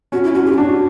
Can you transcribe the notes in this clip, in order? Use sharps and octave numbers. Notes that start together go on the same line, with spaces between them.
C#4 F#4
E4
C#4 F#4
G4
E4
D4 F#4